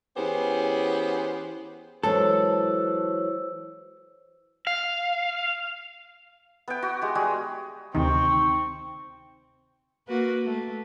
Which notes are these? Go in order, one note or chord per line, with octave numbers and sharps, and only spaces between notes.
E3 B3 C#4 G4 G#4 C5
E3 F#3 G#3 A4 C5 E6
F5
B3 G5
F#4
G#3 G4
G3 G#3 F#4 G#4
D2 C3 D#3 C4 D#4 C#6
A#3 F#4 B4
A3